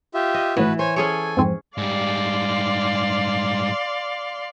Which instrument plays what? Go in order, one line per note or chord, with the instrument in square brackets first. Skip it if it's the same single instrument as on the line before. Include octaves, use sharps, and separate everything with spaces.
[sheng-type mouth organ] F4 G4 E5
[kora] D#5
[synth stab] G#1 A2 [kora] E3 [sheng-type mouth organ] F#4 B4
[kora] C5 [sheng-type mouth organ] C#5 G#5
[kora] C#4 G#4 C#5 [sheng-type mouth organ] A4 G#5
[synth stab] F2 G#2 C4
[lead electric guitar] G#2 G3 [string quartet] D5 F5 C6